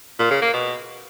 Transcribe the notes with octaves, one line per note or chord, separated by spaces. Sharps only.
A#2
C#3
A#3
B2